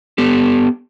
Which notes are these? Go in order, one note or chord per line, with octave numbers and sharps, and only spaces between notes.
B3 G4 A4